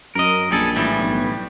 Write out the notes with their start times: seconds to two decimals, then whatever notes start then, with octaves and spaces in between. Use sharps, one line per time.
0.15 F#2 A#4 D#5
0.51 A#1 G3 G#4 A4
0.76 A2 E3 G3
0.99 B1